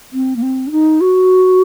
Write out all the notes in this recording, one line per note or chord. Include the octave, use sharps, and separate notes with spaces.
C4
A#3
C4
D4
D#4
F#4